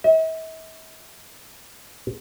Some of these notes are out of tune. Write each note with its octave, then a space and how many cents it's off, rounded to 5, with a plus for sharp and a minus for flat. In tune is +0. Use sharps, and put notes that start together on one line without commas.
E5 -45